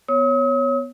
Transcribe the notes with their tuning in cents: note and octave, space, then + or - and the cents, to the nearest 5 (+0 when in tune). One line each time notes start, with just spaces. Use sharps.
B3 +5 C#5 -5 D#6 +45